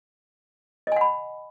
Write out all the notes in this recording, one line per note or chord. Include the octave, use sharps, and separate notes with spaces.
D#5 F#5 G#5 B5